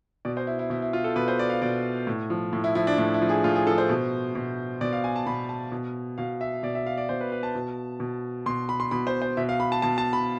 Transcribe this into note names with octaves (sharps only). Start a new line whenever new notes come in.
B2 D5
C5
E4
E4
B2 E4
E4
F4
A4
B2 B4
C5
D5
F5
B2 D5
A2
F3
A2
E4
F3 E4
D4
A2 D4
E4
F3
G#4
A2 F4
G#4
F3 A4
C5
B2
B2
B2 D5
F5
G#5
A5
B2 B5
A5
B2
B2 F5
E5
B2 D5
E5
F5
D5
B2 C5
B4
B4
A5
B2
B2
B2 C6
B5
C6
B2 B5
C5
C5
B2 E5
F5
B5
A5
B2 A5
A5
B5